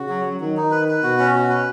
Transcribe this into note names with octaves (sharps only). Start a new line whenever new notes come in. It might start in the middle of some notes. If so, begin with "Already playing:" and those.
Already playing: C#3 F#4
F#3
F#3
D#3 F#3
D#4
B4
B4
B2 F#4
C#4
F#4
B4